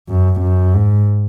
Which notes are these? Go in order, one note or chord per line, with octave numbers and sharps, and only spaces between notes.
F#2
F#2
G#2